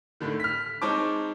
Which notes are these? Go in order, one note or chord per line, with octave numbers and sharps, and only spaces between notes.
A2 D3 D#3
F6 B6
G#3 C4 D#4 C#5 A5 D6